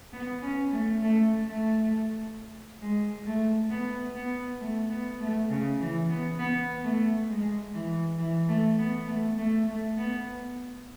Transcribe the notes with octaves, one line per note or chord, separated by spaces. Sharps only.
B3
C#4
A3
A3
A3
G#3
A3
B3
B3
A3
B3
A3
C#3
E3
B3
B3
A3
G#3
E3
E3
A3
B3
A3
A3
A3
B3